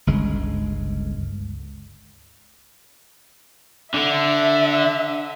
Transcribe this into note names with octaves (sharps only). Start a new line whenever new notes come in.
G1 C#2 G#3
D3 E5